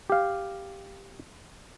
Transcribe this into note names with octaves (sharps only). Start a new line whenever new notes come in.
G4 F5